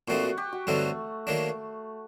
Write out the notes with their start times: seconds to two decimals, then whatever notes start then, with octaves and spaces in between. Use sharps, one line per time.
0.08 A#2 A3 C4 D#4 F#4
0.23 F#4
0.38 G4
0.52 F#4
0.67 G2 D3 F#3 A3 C4 D#4
1.27 D#3 F#3 A#3 D4